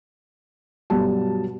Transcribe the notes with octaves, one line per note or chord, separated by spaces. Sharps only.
G2 B2 F#3 G3 A5